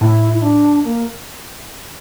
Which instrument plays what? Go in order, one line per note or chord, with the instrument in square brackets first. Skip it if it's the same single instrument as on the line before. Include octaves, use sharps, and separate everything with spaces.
[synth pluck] A2 [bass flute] E4
[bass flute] E4
D4
A#3